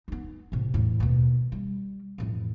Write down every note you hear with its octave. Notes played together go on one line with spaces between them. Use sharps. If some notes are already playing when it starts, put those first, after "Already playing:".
B3 D#4
A2 C3
E2 A2
D#2 B2
G3
A1 F2